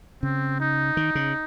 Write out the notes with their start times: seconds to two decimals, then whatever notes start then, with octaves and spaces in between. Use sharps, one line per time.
0.23 C#3 C4
0.60 D#4
0.97 D#3
1.15 C#3